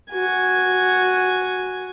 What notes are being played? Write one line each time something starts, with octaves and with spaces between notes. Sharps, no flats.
F#4 G#5